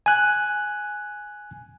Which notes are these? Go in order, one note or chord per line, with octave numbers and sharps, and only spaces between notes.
G#5 F#6